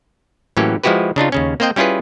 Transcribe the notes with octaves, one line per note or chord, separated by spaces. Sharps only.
A2 E3 F#3 A#3 C#4 G4
F3 G#3 E4 F#4 G4 B4
C#3 D4 D#4 F4
D#2 C#3 C#4
A#3 C4 C5 D#5 G5
G3 C#4 E4 F4 G#4 B4